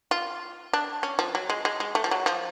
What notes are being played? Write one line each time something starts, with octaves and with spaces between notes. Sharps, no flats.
F4
D4
C#4
F3
F#3
G#3
G#3
G#3
A3
F3
F#3
F3